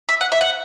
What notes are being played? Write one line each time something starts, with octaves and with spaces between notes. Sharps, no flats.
E5
F#5
E5
F#5